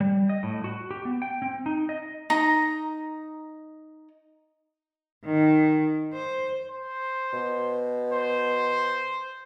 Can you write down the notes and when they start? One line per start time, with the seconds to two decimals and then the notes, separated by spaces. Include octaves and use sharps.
0.01 G3
0.29 D#5
0.43 A2
0.64 F#4
0.91 G4
1.05 B3
1.22 G5
1.42 C4
1.66 D#4
1.89 D#5
2.30 D#4 A#5
5.25 D#3
6.13 C5
6.70 C5
7.33 B2
8.12 C5